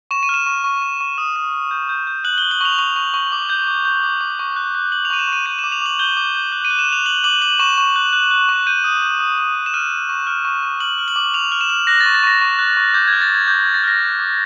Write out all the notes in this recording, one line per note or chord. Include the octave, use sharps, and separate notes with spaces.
C#6 E7
D#7
F6 E7
C#6
C#6
C#6
C#6
D#6
D#6
D#6
G6
G6
G6
F#6 F#7
F#6 G7
F#7
C#6 F7
C#6 F7
C#6
C#6
D6
G6
D6
G6
D6
D6
C#6
F#6
F#6
F#6 F#7
F7
C#6 D#7
E7
C#6 D#7
G6 D#7
D6 E7
F7
D6 F#7
G6 G7
D6
G6
F#6
D#7
F#6
E7
F#6 F7
F#6 F#7
D6 F#7
D6 F#7
C#6 E7
C#6
F#6
F#6
F#6
C#6
G6 D#7
D#6
G6
D#6
D#6
D#6
E7
F6 D#7
F6
C#6
F6
C#6
C#6
F6 F#7
F6
F#7
D6
F6 F7
F6
E7
F6
F#6 A#6
A6
C#6
A6
C#6 A#6
C#6
F#6
C#6
D6 G6
G#6
F6
A6
D6 G#6
D6 G6
F6 G#6
A6
F6 A#6
F#6
D6